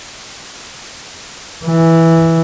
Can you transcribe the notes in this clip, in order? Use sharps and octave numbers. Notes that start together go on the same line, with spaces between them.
E3